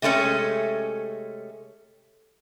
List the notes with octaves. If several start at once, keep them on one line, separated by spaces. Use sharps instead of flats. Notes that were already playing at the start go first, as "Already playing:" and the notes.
C3 G#3 A3 C#4 A4